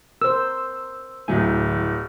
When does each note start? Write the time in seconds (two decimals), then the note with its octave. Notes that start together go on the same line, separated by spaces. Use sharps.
0.22 A#4 C5 E6
1.28 D1 D2 A2 F#3 G#5